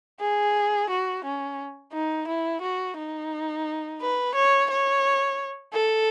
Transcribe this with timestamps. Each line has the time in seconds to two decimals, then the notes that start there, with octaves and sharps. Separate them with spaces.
0.21 G#4
0.90 F#4
1.25 C#4
1.93 D#4
2.28 E4
2.62 F#4
2.98 D#4
4.01 B4
4.35 C#5
4.70 C#5
5.73 A4